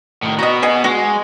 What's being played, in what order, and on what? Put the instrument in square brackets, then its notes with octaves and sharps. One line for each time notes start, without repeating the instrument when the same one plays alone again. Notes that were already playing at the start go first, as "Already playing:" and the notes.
[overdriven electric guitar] A2 D#3
[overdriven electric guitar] B3 F#4 [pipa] D#5 A#5
[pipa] G#4 D#5 G#5
[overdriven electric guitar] G#3 [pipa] F#4